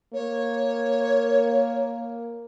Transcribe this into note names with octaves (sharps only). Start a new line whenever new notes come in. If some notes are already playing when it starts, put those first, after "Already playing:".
A#3 C#5